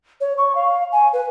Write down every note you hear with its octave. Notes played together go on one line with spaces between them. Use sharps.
C#5
C#6
F5
G#5
B4